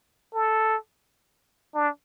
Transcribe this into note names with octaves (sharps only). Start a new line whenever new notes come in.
A4
D4